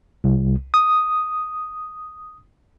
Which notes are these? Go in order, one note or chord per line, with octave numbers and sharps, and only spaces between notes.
C2
D#6